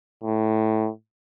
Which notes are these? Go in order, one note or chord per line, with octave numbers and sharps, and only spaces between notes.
A2